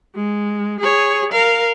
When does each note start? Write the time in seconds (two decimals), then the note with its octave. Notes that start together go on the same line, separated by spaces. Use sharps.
0.15 G#3
0.80 G#4 C#5
1.32 A#4 F5